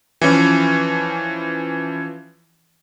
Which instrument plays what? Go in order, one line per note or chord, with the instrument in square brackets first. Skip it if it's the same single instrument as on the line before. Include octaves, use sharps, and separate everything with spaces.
[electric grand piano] E3 F3 C#4